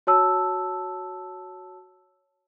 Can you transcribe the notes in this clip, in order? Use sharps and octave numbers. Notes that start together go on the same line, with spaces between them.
F#4 C#5 A5 E6